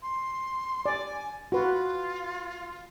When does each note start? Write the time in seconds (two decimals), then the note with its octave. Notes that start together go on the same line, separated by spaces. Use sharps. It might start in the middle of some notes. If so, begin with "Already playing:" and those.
0.02 C6
0.86 D5 G#5
1.52 F4 F#4 B4